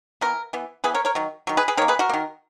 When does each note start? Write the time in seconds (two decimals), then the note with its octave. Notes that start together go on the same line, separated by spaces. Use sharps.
0.21 E3 B3 F#4 A#4
0.53 E3 B3
0.84 E3 B3 G#4 B4
0.94 A#4 C#5
1.05 A#4 C#5
1.15 D#3 F#3
1.47 D#3 F#3
1.57 G#4 B4
1.68 G#4 B4
1.77 D#3 A#4 C#5
1.82 A#3
1.88 G#4 B4
1.99 F#4 A#4
2.09 A#3
2.13 D#3